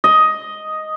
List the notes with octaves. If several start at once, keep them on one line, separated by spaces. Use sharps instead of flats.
D#5